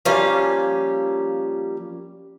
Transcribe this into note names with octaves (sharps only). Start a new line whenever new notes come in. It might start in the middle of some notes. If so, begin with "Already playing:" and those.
F3 G3 A#3 C#4 F5